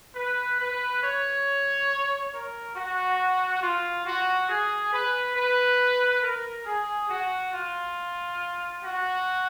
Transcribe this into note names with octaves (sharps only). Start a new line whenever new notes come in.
B4
B4
C#5
A#4
F#4
F4
F#4
G#4
B4
B4
A#4
G#4
F#4
F4
F#4